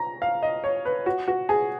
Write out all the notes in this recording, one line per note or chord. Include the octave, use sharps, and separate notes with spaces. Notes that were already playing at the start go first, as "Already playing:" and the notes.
Already playing: A#5
F5
D#5
C#5
B4
F#4
F#4
G#4